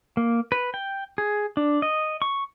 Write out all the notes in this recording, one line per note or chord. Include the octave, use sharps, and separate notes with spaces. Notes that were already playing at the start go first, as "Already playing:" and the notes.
A#3
B4
G5
G#4
D4
D#5
C#6